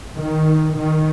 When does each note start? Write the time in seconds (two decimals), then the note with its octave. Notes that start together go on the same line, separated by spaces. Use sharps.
0.18 D#3
0.77 D#3